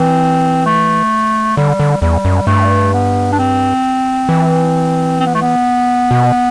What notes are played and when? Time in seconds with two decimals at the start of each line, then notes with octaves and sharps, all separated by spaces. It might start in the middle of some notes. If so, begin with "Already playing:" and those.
Already playing: E3 C4
0.66 A3
1.57 D3 G3
1.80 D3
2.01 E2 G3
2.25 F#2
2.47 G2 A3
2.93 B3
3.32 D4
3.39 C4
4.29 E3
5.20 C4
5.26 B3
5.35 A3
5.42 B3
6.11 B2